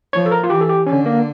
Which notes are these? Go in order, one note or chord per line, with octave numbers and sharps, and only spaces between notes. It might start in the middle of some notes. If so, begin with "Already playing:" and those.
F3 C#5
A4
A#4
F4
E3 G4
A4
G4
D3 C#4
A#3